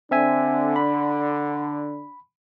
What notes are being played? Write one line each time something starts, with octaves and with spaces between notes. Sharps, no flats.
D3 C4 D4 E5 G#5
B5